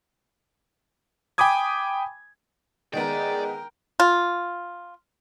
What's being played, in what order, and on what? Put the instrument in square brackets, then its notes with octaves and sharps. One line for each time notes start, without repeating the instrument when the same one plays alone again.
[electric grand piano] G5 G#5 B5 D6 D#6 G#6
[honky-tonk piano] D#3 G#3 B3 [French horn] G#4 [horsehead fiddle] A#4 G5 [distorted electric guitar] D5
[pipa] F4